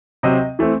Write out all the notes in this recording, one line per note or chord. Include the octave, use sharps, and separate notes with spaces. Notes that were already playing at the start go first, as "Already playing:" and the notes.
C3 F#3 C4 D#5
E3 A3 C4